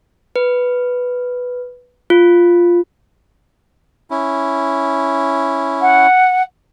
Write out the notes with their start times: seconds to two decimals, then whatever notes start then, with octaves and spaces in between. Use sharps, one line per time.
0.36 B4
2.10 F4
4.10 C#4 E4
5.81 F#5